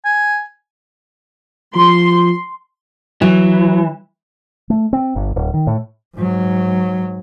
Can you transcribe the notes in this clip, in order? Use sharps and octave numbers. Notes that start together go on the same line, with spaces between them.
G#5
F3 C6
E3 F#3
A3
C4
G1
D1
D#3
A2
G#2 F#3